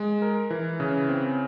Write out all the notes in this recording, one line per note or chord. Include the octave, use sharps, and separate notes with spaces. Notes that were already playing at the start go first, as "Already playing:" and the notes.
Already playing: G#3
A#4
E3
C#3
C4